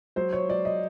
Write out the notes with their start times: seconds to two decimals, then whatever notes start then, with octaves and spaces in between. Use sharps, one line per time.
0.16 F#3 C5
0.33 C#5
0.49 F#3 D5
0.65 D#5